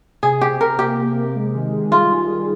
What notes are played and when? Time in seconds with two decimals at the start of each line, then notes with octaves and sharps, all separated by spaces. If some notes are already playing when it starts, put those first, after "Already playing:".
0.23 C3 G#4
0.41 C4 G4
0.60 C3 A#4
0.79 A#3 G4
0.98 C3
1.17 C3
1.35 G#3
1.55 D#3
1.73 G#4
1.92 G3 F4
2.11 D#3
2.30 G3